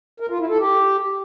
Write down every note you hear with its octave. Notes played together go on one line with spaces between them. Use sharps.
A#4
F4
E4
A4
G4